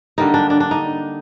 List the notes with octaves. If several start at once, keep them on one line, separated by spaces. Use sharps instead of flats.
D3 G3 A#3 D#4
D4
D4
D4
D#4